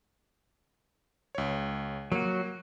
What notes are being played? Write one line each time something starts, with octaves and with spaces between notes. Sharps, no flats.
C#2 C#5
F#3 A#3 F#4